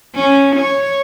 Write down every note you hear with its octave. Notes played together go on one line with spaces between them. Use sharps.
C#4
C#5